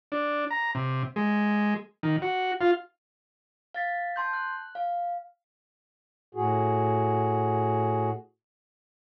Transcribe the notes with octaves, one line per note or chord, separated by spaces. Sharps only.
D4
A#5
C3
G#3
D#3
F#4
F4
F5 A6 B6
A5 C6 G6
F#6
F5
A2 F#4 G#4